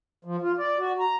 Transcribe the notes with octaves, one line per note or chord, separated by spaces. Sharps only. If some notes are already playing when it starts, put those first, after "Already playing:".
F3
F4
D5
F#4
A#5